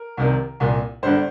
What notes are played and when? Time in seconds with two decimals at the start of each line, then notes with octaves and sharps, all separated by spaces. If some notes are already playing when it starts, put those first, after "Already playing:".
Already playing: A#4
0.17 C2 C3 D#3
0.60 C2 A#2
1.03 G1 G2 D3 C5